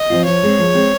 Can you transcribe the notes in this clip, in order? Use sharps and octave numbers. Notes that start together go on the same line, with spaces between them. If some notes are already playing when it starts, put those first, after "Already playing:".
Already playing: D#5
F3 C4 F4
F3 C#5
G#3 C4
F3
G#3 C4